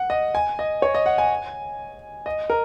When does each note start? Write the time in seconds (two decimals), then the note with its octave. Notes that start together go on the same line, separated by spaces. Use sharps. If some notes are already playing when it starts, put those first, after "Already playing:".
Already playing: F#5
0.10 D#5
0.35 G#5
0.59 D#5
0.82 C#5
0.95 D#5
1.06 F#5
1.18 G#5
2.26 D#5
2.50 A#4